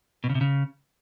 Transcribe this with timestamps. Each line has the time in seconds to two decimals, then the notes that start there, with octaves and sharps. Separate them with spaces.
0.24 B2
0.29 C#3
0.35 C3
0.41 C#3